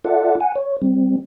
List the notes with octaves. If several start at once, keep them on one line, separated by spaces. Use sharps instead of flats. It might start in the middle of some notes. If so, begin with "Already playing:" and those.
F4 A4 D5 E5 F#5
F#5 G#5
C#5
G3 C4